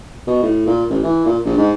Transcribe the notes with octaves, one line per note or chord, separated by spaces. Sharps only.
B2
A2
A#2
A1
E3
A#2
A#1
G#2